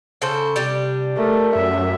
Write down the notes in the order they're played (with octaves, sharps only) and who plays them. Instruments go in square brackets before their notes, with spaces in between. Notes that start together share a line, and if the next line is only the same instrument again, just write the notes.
[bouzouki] C#3 A4 C5
[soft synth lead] C3 [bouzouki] G3 D4 G4
[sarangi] A3 [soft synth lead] A#4
[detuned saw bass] F#2 [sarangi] E5